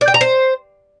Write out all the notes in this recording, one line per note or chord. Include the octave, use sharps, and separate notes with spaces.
D5
G5
A#5
C5